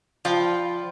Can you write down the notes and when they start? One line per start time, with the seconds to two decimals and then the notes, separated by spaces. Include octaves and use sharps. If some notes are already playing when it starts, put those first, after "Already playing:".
0.25 F3 F4 D5 G5 B5